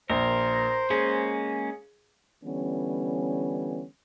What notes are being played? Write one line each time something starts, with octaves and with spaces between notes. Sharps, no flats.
A#1 A#4 C5
G#3 A#3 C#4 G#4
D3 E3 G3 B3 C#4